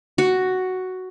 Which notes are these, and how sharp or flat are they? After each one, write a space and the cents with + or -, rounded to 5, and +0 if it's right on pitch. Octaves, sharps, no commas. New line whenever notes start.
F#4 +5